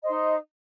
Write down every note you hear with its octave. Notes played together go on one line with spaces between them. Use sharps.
D#4 C5 D#5